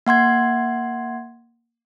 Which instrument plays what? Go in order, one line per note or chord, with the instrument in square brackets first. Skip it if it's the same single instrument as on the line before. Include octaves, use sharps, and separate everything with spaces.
[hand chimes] A#3 F#5 C6 G#6